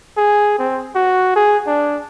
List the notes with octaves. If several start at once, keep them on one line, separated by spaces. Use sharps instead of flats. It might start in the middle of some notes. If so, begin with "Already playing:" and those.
G#4
C4
F#4
G#4
D4